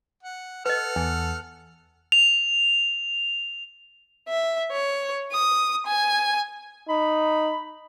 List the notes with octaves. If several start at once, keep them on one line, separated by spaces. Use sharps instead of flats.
F#5
A4 B4 D#5 F#5 F6
E2 G#5
F7
E5
C#5
D#6
G#5
D#4 B5